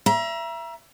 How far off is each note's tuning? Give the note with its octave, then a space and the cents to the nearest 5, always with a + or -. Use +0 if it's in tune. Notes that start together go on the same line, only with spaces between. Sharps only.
E5 +25 A#5 +35